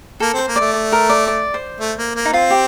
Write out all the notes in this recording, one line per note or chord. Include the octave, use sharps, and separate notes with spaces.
A#3 A4
C4
C5
A#3
A3 D5
D5
A#4
D5
D5
C5
A3
A#3
A#3
D#4
C4 F4
G4